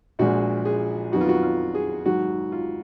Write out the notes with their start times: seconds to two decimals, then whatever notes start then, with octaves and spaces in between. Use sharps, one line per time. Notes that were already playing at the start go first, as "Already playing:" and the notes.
0.19 A#1 A#2 F3 G#3 F#4
0.65 G#4
1.12 F2 D#3 F#3 B3 F#4
1.21 F4
1.29 F#4
1.43 F4
1.75 G#4
2.06 G#2 D#3 F#3 F#4
2.52 F4